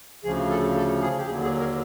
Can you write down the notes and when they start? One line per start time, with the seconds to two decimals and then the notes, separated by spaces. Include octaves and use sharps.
0.24 D2 C#3 F3 G#4
0.50 A4
0.76 A4
1.01 G#4
1.18 G4
1.26 D#2 D3 F#3 G#4
1.43 G#4
1.60 A#4